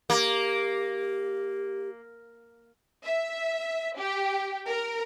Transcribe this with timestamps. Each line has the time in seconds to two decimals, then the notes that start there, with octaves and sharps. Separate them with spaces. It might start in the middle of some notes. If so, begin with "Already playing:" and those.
0.10 A#3 G4
3.04 E5
3.99 G4
4.67 A#4